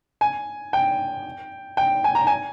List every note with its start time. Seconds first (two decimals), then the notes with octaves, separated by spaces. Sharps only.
0.21 G#5
0.73 G5
1.77 G5
2.04 G#5
2.15 A#5
2.27 G#5